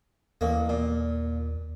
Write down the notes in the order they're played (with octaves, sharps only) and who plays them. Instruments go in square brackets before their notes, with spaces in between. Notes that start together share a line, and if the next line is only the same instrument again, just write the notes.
[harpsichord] A1 A#3 [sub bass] D#2
[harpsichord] A#2